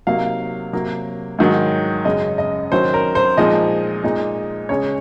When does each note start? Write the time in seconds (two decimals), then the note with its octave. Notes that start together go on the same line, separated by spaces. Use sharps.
0.07 C3 F#3 A#3 D#4 F5
0.73 C3 F#3 A#3
1.39 G#2 D#3 F#3
2.05 F#2 C#3 G#3 D#5
2.38 D#5
2.72 D#3 F#3 C#4 C5
2.94 A#4
3.15 C5
3.37 A#2 F3 G#3 D#4 D#5
4.03 A#2 G#3 D#4
4.69 C#3 G#3 C#4 C#5